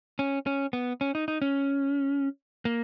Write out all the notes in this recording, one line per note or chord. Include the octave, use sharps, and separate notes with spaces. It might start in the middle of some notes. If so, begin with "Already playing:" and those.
C#4
C#4
B3
C#4
D#4
D#4
C#4
A#3